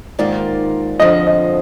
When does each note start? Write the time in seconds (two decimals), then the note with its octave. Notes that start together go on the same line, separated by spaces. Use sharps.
0.19 G#2 D#3 A#3 F4 D5
1.00 F2 D3 F3 D#5
1.27 D#5